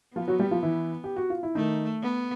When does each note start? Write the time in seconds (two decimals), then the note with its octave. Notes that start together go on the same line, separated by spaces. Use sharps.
0.15 F3 B3 F4
0.28 F#3 F#4
0.39 G3 G4
0.51 F3 F4
0.63 E3 E4
1.04 G4
1.16 F#4
1.30 F4
1.43 E4
1.55 D#3 A3 D#4
2.02 B3